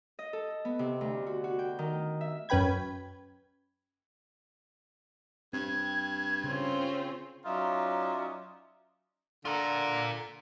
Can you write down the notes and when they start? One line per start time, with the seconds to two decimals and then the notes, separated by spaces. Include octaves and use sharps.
0.19 D#5
0.33 A4
0.65 B3
0.79 C3
1.01 D2
1.26 F#4
1.44 F#4
1.59 G5
1.79 D#3
2.21 E5
2.49 F#2 C#4 B4 G5 B5 G#6
5.53 G2 C4 G#6
6.44 C#3 C4 C#4 F4
7.45 F#3 C#4 D#4 F4 D5 E5
9.45 D3 F4 A#4